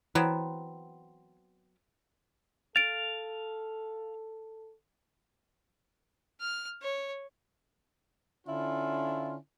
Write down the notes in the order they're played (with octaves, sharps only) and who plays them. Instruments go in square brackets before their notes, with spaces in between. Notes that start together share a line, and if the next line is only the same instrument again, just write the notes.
[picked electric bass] E3 [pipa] F#3 B3 C4
[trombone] A4 [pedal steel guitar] F5 [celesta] A6 D7
[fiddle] F6
C#5
[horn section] D3 C#4 E4 F4